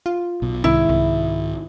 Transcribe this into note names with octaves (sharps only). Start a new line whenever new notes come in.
F4
B1 B2
C2 G#2 D#3 G#3 E4
C2